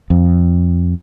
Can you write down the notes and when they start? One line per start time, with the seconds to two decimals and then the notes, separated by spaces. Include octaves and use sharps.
0.10 F2